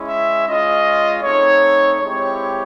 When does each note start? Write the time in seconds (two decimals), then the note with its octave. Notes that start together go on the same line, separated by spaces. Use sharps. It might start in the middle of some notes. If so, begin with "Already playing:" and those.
Already playing: G#3 C#4 E4
0.09 E5
0.47 G#3 C#4 F4 D#5
1.23 A3 C4 D#4 C#5
2.00 G#3 C4 E4 G4 C#5